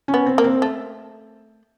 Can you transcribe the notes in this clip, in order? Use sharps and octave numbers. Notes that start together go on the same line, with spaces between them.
C#4
B3
C4
A#3
C4
A3